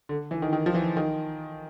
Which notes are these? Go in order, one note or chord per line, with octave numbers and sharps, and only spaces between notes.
D3
E3
D#3
D#3
F3
E3
D#3